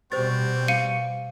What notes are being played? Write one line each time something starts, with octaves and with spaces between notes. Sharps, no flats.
B2 G3 C4 C5 C#6 A6
F5 C#7 D#7